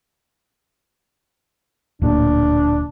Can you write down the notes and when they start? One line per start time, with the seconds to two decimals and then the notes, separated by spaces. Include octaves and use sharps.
2.02 D1 A#2 D4